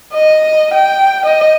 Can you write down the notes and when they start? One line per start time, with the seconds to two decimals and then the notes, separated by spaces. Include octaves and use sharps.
0.13 D#5
0.74 G5
1.26 D#5